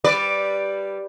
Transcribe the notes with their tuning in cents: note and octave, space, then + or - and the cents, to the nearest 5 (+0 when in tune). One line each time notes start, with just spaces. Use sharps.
G3 +0 B4 +0 D5 +0